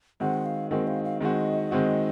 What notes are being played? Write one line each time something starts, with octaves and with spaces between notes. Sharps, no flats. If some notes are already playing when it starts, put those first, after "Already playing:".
D#3 G#3 C4 F#4 F#5
F5
D#3 G#3 C4 F#4 A#4
F5
F5
D#3 G#3 C4 F#4 D#5
D#3 G#3 C4 F#4